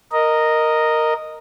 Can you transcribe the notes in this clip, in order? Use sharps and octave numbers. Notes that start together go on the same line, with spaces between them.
A#4 D#5